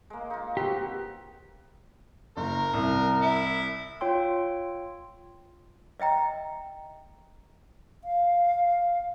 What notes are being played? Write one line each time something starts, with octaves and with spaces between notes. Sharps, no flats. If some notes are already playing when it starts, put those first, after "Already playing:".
G#3 A#3
D#4 F4
C4 F#4 G4 B4
F#1 A#4
C2
E4
F4 C#5 G5 C6 E6
D#5 E5 G5 A#5
F5